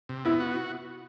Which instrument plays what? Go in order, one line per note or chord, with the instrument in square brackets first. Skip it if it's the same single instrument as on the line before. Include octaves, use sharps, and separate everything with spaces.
[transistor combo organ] C3
[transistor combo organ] B3 [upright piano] E4
[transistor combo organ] F#4